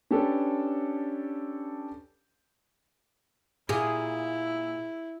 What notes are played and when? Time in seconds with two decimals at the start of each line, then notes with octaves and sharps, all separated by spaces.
0.11 C#4 D4 G4 A4 B4
3.69 A#2 E4 G4 G#4